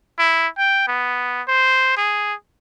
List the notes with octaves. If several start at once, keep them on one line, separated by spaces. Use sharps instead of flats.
E4
G5
B3
C5
G#4